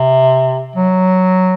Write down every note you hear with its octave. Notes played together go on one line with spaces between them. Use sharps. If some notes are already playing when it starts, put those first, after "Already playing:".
Already playing: C3
F#3